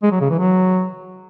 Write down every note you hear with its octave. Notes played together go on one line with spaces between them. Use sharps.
G#3
F#3
C#3
E3
F#3